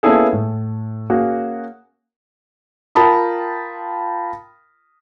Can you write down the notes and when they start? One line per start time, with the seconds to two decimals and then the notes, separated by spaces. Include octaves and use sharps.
0.03 A#3 B3 C#4 E4 G#4 A4
0.33 A2
1.10 A#3 C#4 F#4 G#4
2.95 F4 A#4 G5 A5 B5 D#6